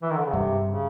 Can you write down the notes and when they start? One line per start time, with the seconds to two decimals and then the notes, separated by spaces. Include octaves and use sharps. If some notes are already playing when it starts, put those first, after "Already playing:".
0.02 E3
0.11 D#3
0.18 D3
0.25 C#3
0.33 G2 C3
0.69 C#3